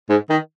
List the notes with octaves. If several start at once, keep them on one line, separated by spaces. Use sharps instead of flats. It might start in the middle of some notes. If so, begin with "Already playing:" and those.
G#2
D#3